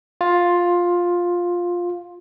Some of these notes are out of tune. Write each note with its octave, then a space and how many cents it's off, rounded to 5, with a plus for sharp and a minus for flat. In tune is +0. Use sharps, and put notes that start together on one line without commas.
F4 +10